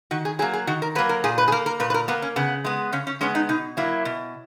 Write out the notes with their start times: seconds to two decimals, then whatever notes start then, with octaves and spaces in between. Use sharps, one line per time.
0.11 D#3 F#4
0.25 G#4
0.39 F#3 G#4
0.42 A#3
0.53 G#4
0.67 D#3 F#4
0.82 A#4
0.95 F#3 B4
0.98 A#3
1.09 A#4
1.24 A#2 G#4
1.38 B4
1.48 G#4
1.52 A#3 A#4
1.66 A#4
1.80 A#2 B4
1.90 B4
1.94 A#4
2.08 A#3 B3
2.22 C#4
2.36 C#3 B3
2.65 G#3 B3
2.92 C#3 C#4
3.07 C#4
3.21 G#3 B3 C#4
3.35 D#4
3.49 B2 D#4
3.77 F#3 A#3 E4
4.05 B2